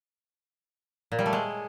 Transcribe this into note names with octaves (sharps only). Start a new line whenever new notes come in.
A#2
G3
A3
G#3